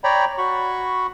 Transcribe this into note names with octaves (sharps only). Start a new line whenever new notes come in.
C#5 D5 G5 A#5 B5
F#4 B5 C#6